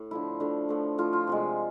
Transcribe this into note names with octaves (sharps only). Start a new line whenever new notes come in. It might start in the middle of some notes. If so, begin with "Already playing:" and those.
Already playing: A2
D3 F3 A3 E4
D3 F3 A3
A2 F3 A3
A2 F3 A3 F4
F4
C3 F3 G#3